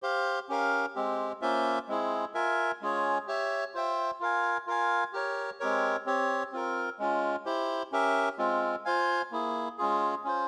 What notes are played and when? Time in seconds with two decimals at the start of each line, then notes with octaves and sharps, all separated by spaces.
0.03 G4 C5 F5
0.49 C#4 G4 A#4 F5
0.95 G#3 C4 G4
1.42 A#3 C#4 F4 C5 E5
1.88 G#3 C4 E4 G#4
2.34 F4 A#4 E5 G#5
2.81 G#3 C#4 F4 G#4 C#5
3.27 G4 C#5 E5
3.74 F4 C5 E5 G5
4.20 F4 A#4 F5 G#5
4.67 F4 A#4 F5 G#5
5.13 G4 A#4 C#5
5.60 G#3 C4 G4 A#4 C#5
6.06 C4 G4 C#5
6.52 C4 F4 A#4
6.99 G#3 C#4 F4
7.46 E4 G4 C5
7.92 C#4 G4 A#4 E5
8.38 G#3 C4 F4
8.85 F4 C5 F5 G#5
9.31 A#3 E4 G#4
9.78 G#3 C#4 F4 G#4
10.24 C#4 F4 C5